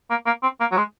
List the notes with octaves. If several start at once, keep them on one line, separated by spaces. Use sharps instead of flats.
A#3
A#3
C4
A#3
F#3
G#3